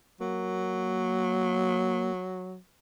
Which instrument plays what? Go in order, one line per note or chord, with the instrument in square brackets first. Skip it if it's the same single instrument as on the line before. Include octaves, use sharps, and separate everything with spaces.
[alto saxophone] F#3 [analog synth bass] A#3